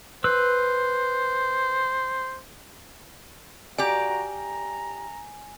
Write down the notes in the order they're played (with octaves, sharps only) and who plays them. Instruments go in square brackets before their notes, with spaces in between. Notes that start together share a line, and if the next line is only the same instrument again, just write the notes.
[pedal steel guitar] B4 E6 [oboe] C5
[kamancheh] F#4 A#5 [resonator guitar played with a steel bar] G4 D5 [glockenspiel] G#5
[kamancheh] A#5